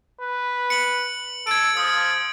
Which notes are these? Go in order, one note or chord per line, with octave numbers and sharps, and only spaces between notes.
B4
C#7 F#7
A4 G#6 D7
F3 D#6